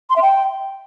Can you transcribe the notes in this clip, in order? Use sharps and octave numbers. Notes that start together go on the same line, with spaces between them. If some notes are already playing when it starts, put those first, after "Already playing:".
C6
E5
G5